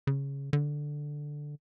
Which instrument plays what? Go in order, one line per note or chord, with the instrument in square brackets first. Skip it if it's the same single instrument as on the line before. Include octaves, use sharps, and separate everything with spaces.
[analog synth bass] C#3
D3